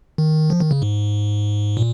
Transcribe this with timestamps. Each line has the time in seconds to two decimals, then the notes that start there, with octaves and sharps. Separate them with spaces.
0.18 D#3
0.50 F3
0.60 D#3
0.71 C#3
0.82 G#2
1.77 A#2